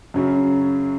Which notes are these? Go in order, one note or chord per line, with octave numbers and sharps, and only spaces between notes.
F#2 C#3 F#3 C#4